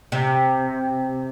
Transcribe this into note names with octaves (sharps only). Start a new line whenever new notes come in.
C3